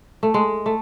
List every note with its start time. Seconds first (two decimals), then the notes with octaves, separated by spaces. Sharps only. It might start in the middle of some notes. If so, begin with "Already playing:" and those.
0.23 A3
0.34 G#3
0.66 A3